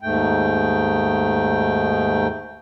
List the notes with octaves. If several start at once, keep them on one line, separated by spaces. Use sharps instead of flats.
D#2 G#2 A3 G5